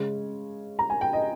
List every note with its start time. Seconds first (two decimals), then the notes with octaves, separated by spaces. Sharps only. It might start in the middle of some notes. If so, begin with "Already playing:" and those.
Already playing: C#3 G#3 C#4
0.79 A#5
0.90 G#5
1.01 G5
1.13 D#5